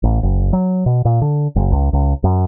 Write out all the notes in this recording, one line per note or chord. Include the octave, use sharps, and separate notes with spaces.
A1
F#1
F#3
B2
A#2
D3
F#1
C#2
C#2
F#2